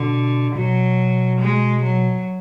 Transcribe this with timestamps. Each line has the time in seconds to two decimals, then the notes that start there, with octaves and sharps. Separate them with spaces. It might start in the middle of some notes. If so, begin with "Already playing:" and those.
Already playing: B2 D3
0.56 B2 F#3
1.41 G#3
1.83 F#3